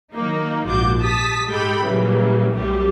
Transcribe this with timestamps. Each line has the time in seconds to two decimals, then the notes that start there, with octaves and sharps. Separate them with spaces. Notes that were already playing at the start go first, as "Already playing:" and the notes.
0.13 D#3 F#3 A#3 D#4
0.67 A#1 G#2 F4 F#4 D6 G6
1.00 G4 A5 D#6 B6
1.49 G#2 G#3 G4 A4 G5 B5
1.84 A#2 C#3 E3 F#3 G3
2.55 B1 F#2 G3 A3 G4